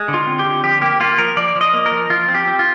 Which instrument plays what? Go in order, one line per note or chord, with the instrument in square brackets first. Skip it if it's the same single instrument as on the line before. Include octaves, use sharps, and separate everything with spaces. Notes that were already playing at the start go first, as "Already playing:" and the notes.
Already playing: [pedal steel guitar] G#3
D3
F4
C4
G4
D3
F3 G4
A#3 G4
A#3 F4
F3 A#4
F3 D5
F3
D#5
A#3
A#4
F3
F3 F4
C4
G4
C4
F4